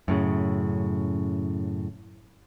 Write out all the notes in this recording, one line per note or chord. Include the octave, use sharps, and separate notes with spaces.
F#2 A2 C#3